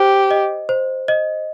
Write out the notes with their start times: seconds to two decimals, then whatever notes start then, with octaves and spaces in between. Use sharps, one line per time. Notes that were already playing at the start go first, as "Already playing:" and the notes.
Already playing: G4 C5
0.31 D#5
0.69 C5
1.08 D#5